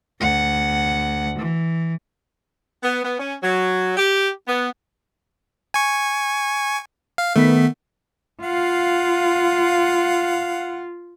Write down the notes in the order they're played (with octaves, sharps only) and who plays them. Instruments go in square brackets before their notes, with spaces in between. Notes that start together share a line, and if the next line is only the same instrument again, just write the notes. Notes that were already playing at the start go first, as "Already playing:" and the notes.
[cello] D2 F#5
E3
[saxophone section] B3
B3
C#4
F#3
G4
B3
[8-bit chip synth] G#5 C#6
F5
[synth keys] D#3 B3 B6 [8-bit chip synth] A3
[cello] F4 [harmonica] F5 F#5